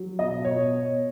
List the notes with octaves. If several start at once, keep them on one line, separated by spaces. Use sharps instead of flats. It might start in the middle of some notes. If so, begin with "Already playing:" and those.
Already playing: F#3
B2 D#5
B2 C#5